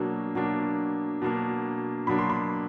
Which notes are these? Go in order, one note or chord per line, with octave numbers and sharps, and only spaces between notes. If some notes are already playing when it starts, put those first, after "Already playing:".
Already playing: B2 F#3 A#3 D4
B2 F#3 A#3 D4
B2 F#3 A#3 D4
B2 F#3 A#3 D4 B5
C6
B5